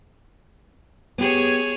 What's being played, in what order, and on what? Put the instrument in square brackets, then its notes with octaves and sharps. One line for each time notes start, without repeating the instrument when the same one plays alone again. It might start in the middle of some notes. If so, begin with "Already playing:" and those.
[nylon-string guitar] B3 G4 [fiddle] G#4 C#5